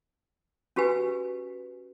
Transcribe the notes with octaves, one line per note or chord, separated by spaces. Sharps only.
C#4 F#4 G4 B4 G#5